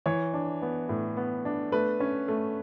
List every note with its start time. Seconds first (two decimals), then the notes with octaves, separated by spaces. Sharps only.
0.06 E3 C#5
0.34 D4
0.62 B3
0.89 A2
1.17 B3
1.45 D4
1.72 A3 B4
2.00 C#4
2.28 A3